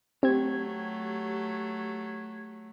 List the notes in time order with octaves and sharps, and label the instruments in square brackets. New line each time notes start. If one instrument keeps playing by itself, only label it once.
[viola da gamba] F#3 A3 [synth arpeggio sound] C4 [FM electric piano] G4 G#6